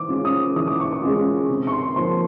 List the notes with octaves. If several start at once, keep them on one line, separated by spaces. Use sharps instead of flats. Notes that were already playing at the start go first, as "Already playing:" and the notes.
Already playing: E3 D6
G#3 C#4 F4
D#6
E3 D#6
D6
C#6
D6
G#3 C#4 F4
C3
C#6
C6
F3 A#3 C6